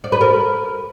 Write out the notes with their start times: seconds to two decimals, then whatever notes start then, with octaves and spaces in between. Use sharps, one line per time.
0.04 D5
0.12 B4
0.21 A#4